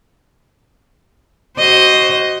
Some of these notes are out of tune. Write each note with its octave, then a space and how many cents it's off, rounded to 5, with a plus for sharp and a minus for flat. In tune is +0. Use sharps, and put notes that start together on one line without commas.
F#4 +25 C5 +5 D#5 +0